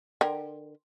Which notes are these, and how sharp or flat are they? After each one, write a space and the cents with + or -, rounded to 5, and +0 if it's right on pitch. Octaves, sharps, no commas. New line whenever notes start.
D3 +30 A#4 +15 G5 +0